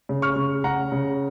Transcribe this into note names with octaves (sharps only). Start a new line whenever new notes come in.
C#3
C#6 F6
C#3
C#3 F#5 A#5
C#3